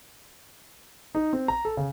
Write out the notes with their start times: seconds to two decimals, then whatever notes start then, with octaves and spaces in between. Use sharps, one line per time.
1.15 D#4
1.33 C4
1.48 A#5
1.65 A4
1.77 C#3